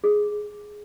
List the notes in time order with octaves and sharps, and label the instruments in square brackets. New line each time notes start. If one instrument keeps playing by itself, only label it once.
[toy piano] G#4